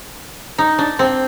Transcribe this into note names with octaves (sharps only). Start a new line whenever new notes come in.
D#4
D4
C4